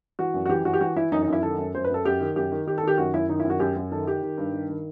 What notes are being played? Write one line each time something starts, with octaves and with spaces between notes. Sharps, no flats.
E3 F#4
F#2
F#4
E3 G4
E3 F#4
G4
E3 F#4
E3 E4
F#2 D#4
D#4
F#2
E4
D#3 A4
F#2
F#2 C5
B4
F#2 A4
F#2 G4
D#3
F#2 G4
D#3
D#3 G4
A4
D#3 G4
F#2 F#4
F#2 E4
D#3 D#4
E4
F#2 F#4
F#2 G4
F#2
D#3 A4
D#3 G4
D#3
G2
D#3
D#3